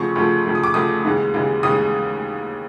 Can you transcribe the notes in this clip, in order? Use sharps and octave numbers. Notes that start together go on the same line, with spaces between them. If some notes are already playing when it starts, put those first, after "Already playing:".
Already playing: D2 C#3 F3 A3 C#6
D2 C#3 F3 A3
D2 C#3 F3 A3
D#6
D6
D2 C#3 F3 A3 D#6
D#2 C#3 E3 G#3
D#2 C#3 E3 G#3
D#2 C#3 E3 G#3 D#6